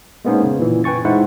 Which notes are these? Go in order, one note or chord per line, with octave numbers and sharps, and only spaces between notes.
G#3 A#3 B3 C#4 D#4 C5
C#3
A#2 E3
B4 G5 G#5 C#6 A6
G#3 D#4 E4 C5 F#5